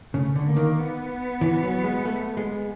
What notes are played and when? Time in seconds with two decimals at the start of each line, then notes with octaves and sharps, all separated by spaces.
0.14 C#3 A3
0.35 D3
0.46 A#3
0.56 D#3
0.78 B3
1.41 E3
1.63 F#3
1.84 G#3
2.05 A3
2.37 G#3